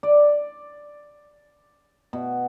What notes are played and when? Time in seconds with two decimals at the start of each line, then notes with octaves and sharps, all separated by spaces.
0.03 D5
2.13 B2